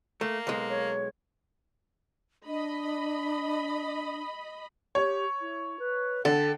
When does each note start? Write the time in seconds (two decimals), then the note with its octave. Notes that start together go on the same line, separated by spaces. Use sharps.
0.21 A3 A#3
0.47 B1 G#3
0.69 C#5
2.46 D4 D#5 B5
4.95 G4 C#5
5.41 E4
5.79 B4
6.25 D3 A4 G5